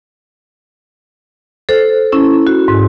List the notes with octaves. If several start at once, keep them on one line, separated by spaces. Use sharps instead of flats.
A4 C5
C#4 E4
F#4
G#2